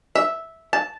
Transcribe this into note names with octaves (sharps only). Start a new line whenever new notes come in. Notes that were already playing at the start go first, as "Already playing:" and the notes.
E5
A5